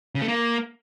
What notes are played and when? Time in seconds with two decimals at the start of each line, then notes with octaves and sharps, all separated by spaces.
0.15 C#3
0.22 A3
0.28 A#3